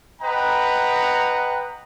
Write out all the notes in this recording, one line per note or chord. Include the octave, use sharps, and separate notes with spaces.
B4 D#5 F#5 G5 A#5